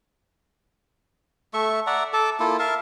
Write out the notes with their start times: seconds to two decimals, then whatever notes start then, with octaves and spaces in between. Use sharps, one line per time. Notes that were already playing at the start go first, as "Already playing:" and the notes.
1.54 A3 E5 C#6
1.87 D5 E5 F#5 A#5
2.13 A4 A5 D6
2.40 A#3 E4 F4 A4
2.59 A#4 E5 F5 A5